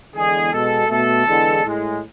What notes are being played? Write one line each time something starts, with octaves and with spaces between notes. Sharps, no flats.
E2 D3 G#3 G#4
B2 G#3 A4
B2 A3 A4
E2 D3 G#3
A2 G#3